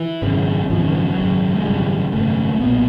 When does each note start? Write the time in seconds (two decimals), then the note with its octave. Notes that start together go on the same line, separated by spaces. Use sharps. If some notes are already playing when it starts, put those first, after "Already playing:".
Already playing: E3
0.22 G#1 F#2 C#3
0.70 G#1 F#2 C#3 F3
0.82 D#3
0.94 F3
1.05 F#3
1.17 G#1 F#2 C#3
1.54 G#3
1.64 G#1 F#2 C#3 G3
2.12 G#1 F#2 C#3 A3
2.60 B1 A#2 B3